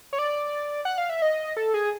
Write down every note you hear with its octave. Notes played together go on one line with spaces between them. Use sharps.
C#5
D5
F#5
F5
E5
D#5
A4
G#4